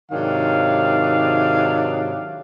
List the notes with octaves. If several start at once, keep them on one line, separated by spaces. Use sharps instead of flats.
G#2 C3 D#3 F#3 D4 F5